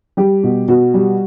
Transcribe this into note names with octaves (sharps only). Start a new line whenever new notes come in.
G3 G4
B2
B2 F#4
G3